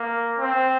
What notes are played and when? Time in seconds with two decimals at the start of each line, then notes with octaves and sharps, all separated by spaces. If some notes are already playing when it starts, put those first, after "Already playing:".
Already playing: A#3
0.38 C4